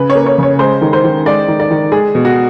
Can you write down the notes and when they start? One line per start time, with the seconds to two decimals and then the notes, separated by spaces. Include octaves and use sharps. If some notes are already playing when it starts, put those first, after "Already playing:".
Already playing: C#3 B4
0.10 C#5
0.15 A#3
0.26 C#5
0.38 C#3 C#5
0.59 G#3 C5
0.81 D#3
0.93 C5
1.04 D#3
1.26 G#3 D5
1.48 D#3
1.60 D5
1.71 D#3
1.92 G#3 G#4
2.15 B2
2.25 F#4